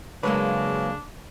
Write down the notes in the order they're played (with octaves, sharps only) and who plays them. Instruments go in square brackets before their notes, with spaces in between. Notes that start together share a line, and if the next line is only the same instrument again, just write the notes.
[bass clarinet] C#3 [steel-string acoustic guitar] F#3 G#3 A#3 [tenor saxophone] D4 [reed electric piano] B4 C#5